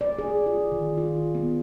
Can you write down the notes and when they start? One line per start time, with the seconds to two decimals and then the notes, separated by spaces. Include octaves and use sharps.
0.01 D5
0.18 G#4
0.46 F4
0.72 D#3
0.97 F4
1.35 B3